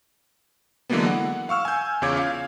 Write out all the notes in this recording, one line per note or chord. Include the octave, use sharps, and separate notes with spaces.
D3 E3 F#3 G#3 A#3 B3
F#5
F5 C#6 E6 F6
G#5 G6
E2 C#3 F4 C#5 D6 G#6
F5